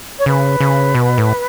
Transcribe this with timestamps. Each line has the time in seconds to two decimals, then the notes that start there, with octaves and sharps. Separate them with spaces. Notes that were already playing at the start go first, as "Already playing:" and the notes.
0.18 C#5
0.26 C#3 B4
0.60 C#3
0.95 B2
1.18 A2